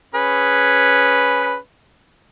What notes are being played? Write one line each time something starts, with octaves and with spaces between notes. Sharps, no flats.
C#4 G#4 B4